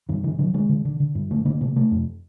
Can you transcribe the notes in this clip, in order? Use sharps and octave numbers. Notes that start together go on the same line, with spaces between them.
G2 D#3
D3 E3
D3 F#3
D3 G#3
D3
D3
D3
G2
D3 A3
D3 A#3
C3 A#3
C3 A3
F2